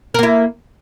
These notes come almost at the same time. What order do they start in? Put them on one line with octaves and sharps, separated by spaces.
A#4 A#3 E4